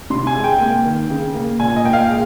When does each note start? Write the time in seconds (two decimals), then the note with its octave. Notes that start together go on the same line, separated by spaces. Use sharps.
0.10 C3 C6
0.27 G#5
0.35 G#3
0.44 G5
0.60 A#3
0.85 D#3
1.10 C#3
1.35 A#3
1.60 A#2 G#5
1.76 D#5
1.84 A#3 G5
1.93 F5
2.09 G#3